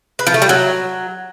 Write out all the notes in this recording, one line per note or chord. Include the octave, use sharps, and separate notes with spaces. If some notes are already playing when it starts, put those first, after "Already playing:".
B4
F3
A3
G3
F#3